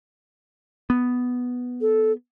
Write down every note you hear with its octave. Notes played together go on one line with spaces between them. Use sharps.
B3
A4